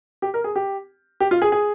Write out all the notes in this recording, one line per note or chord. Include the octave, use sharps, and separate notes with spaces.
G4
A#4
G#4
G4
G4
F4
G#4
G#4